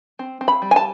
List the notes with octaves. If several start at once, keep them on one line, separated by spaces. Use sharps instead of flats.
C4
C4
B5
G3
G#5
A5